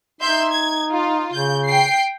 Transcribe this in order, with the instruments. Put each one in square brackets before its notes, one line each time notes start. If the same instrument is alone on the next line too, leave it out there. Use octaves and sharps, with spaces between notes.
[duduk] D#4 [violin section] E5 C6 G6
[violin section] G#6
F4
[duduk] C#3 [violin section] G6
[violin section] G5 C7